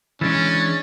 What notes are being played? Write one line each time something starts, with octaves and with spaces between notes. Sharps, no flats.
E3 G#3 C#4 D4 A6